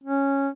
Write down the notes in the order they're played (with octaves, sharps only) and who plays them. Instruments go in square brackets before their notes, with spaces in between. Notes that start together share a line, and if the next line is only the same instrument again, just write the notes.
[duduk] C#4